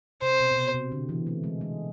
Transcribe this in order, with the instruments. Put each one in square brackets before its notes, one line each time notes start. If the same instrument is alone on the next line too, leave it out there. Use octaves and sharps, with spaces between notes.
[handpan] C3 [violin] C5
[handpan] B2
B2
C3
C3
D3
E3
A3
G#3
G#3